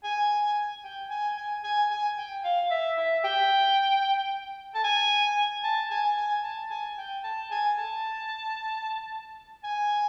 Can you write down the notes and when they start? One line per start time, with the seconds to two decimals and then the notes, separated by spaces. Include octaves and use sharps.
0.04 G#5
0.84 G5
1.11 G#5
1.37 G#5
1.64 G#5
1.91 G#5
2.17 G5
2.44 F5
2.71 E5
2.98 E5
3.24 G5
4.75 A5
4.84 G#5
5.64 A5
5.91 G#5
6.17 G#5
6.44 A5
6.70 G#5
6.98 G5
7.24 A5
7.51 G#5
7.78 A5
9.64 G#5